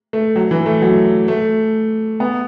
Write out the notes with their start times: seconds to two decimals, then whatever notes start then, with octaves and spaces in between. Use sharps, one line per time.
0.13 A3
0.36 F#3
0.51 E3
0.66 A3
0.82 F#3
1.28 A3
2.20 B3